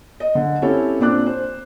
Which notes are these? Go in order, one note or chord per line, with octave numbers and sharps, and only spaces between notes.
D#5
D3
C4 C#4 E4 G4 A4 C#5
A#2 C4 D4 D6 F#6
C5